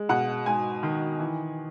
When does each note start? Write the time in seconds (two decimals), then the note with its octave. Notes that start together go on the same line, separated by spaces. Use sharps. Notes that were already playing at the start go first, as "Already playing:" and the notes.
Already playing: G#3
0.09 B2 F#5
0.46 G#2 G#5
0.83 D#3
1.20 E3